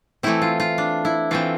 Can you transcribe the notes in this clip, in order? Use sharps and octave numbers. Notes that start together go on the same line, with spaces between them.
E3 A3 C4 E4
F4
F4
D4
E4
E3 A3 C4 F4